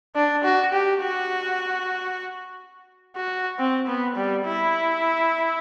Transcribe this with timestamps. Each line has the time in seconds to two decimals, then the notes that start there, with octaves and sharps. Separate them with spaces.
0.15 D4
0.44 F#4
0.73 G4
1.02 F#4
3.16 F#4
3.59 C4
3.87 B3
4.16 G3
4.45 E4